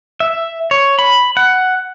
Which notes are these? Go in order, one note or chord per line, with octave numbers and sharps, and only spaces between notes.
E5
C#5
B5
F#5